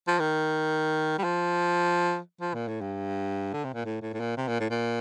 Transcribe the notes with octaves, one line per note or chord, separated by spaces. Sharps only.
F3
D#3
G3
F3
F3
A#2
A2
G2
D3
C3
A#2
A2
A2
A2
A#2
C3
A#2
A2
A#2